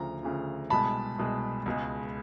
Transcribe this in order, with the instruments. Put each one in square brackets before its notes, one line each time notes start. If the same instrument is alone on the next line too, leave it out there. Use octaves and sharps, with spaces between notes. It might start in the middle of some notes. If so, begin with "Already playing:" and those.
Already playing: [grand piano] D2 C#3 F3 A#5
D2 C#3 F3
C2 B2 G#3 A5 B5
C2 B2 G#3
C#2 B2 G#3